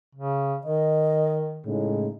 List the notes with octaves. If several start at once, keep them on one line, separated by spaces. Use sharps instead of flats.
C#3
D#3 D#5
A2 C#3 G#3 D#4